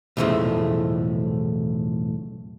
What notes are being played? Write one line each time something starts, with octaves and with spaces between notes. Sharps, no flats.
B1 E2 A2 C#3 F3 A3